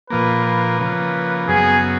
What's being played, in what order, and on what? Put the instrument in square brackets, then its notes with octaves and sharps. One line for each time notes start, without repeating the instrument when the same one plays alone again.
[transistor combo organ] A#2 F3 A#3 [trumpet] B4
[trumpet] B4
[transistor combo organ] C#3 F3 A#3
[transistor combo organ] F#2 C#3 F#3 B3 [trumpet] G#4